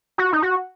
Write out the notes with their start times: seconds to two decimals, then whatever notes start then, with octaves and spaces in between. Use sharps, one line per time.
0.18 F#4
0.33 D#4
0.43 F#4